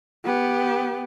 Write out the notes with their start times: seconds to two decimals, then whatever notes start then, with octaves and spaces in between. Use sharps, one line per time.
0.25 B3 G4